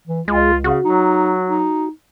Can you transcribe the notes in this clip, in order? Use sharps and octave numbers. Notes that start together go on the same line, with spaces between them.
E3
C#2 G#3 F4
C#3 F#4
F#3 D#4
D#4